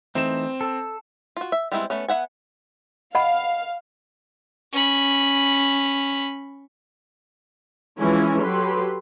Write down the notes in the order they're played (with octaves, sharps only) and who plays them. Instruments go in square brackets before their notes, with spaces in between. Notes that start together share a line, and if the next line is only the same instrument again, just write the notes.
[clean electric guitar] E3 A3 D#4 [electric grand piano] C4 E7
[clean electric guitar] A4
[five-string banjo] F4 F#4
E5
G3 G#3 B3 C4 E4
A3 B3 C#4
B3 E5 F#5 G#5
[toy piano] D#5 F#5 B5 [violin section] F5
[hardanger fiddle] C#4 B5
[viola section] E3 F3 G#3 C#4 E4 G#5
F#3 G4 A4 B4 B5 C6